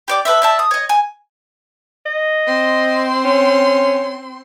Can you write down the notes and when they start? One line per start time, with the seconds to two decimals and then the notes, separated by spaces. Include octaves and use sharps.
0.08 G4 D5 D6
0.25 A4 B4 C5 E5
0.42 D5 E5 A5
0.59 D#6
0.71 C#5 D#5
0.89 G#5
2.06 D#5
2.47 C4 C6
3.25 C#4